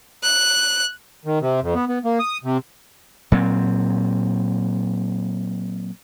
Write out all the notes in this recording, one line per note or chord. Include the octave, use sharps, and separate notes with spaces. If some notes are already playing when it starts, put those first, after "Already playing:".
F#6
D#3
C3
F2
B3
B3
A#3
D#6
C3
A#2 F#3 C4